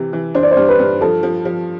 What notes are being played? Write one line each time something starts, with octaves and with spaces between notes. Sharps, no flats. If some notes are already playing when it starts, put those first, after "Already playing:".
Already playing: C3 E3
E3
D4 C5
D5
C5
G2
B4
G2
F3 A4
F3
F3